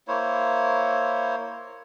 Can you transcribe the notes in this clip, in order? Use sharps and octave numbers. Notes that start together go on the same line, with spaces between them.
A#3 E4 C5 C#5